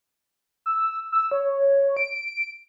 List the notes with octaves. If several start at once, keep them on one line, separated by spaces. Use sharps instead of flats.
E6
E6
C#5
D7